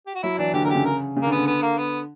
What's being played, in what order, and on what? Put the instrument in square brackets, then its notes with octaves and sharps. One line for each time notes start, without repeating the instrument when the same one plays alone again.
[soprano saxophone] G4
F#4
[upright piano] F#3 [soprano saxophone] E4
[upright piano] E3 [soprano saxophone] D4
[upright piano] D3 [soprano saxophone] G4
[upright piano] D3 [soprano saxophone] A#4
[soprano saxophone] G4
[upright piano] C#3
[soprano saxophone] A#4
[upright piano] C#3
[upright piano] D3 [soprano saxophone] A#3
[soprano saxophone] B3
[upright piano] D3
[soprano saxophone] B3
A#3
B3